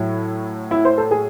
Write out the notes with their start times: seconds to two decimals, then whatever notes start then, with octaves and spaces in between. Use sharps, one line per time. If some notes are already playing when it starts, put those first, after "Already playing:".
Already playing: A2 F#3 E4
0.71 E4
0.85 C5
0.98 A4
1.11 G#4